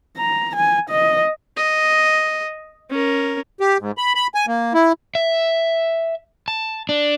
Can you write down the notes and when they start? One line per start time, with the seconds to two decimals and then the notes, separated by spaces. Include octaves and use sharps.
0.17 A#5
0.56 G#5
0.90 D#5
1.57 D#5
2.91 C#4 A#4
3.60 G4
3.80 G#2
3.98 B5
4.15 B5
4.35 G#5
4.47 A#3
4.74 E4
5.15 E5
6.48 A5
6.89 D4